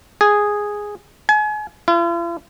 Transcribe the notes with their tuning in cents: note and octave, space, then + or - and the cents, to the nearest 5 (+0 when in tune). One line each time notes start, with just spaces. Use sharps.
G#4 -5
G#5 +35
F4 -45